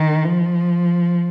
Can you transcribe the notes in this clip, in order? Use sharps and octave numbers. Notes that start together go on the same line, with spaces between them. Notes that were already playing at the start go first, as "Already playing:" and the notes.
Already playing: D#3
F3